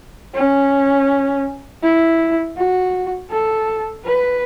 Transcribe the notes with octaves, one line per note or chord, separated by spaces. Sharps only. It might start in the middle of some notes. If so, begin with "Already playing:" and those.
C#4
E4
F#4
A4
B4